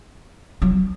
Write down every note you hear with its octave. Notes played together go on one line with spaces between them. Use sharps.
F#3